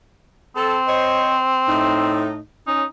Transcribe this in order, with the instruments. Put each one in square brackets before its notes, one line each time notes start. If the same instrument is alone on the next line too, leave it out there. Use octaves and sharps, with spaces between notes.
[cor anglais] C4 [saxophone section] A4
[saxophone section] C5 C#5 D#5
A2 D#4
[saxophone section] C#4 [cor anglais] D#4